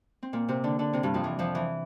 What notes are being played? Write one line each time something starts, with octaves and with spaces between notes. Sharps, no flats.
C4
A#2 A#3
C3 C4
D3 D4
D3 D4
C3 C4
G2 G3
F2 F3
E3
F2 F3
E3